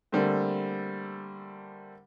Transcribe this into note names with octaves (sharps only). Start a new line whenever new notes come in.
D3 G3 A3 A#3 C4